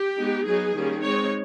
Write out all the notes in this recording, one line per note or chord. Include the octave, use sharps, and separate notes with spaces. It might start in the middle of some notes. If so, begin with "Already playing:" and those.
Already playing: G4
G#3 B3 D#4
F#3 B3 D#4 G#4
D#3 G3 A#3 C#4
G#3 C4 D#4 C#5